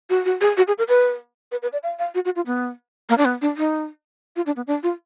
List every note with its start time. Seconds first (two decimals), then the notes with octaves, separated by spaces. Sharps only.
0.10 F#4
0.25 F#4
0.41 G#4
0.57 F#4
0.68 G#4
0.78 A#4
0.89 B4
1.52 B4
1.62 B4
1.73 D5
1.83 F5
1.99 F5
2.15 F#4
2.25 F#4
2.36 F4
2.47 B3
3.09 A#3
3.18 D4
3.25 B3
3.42 D4
3.57 D#4
4.36 F4
4.46 D4
4.56 B3
4.67 D4
4.83 F4